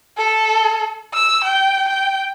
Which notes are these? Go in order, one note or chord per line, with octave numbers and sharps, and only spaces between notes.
A4
E6
G5
G5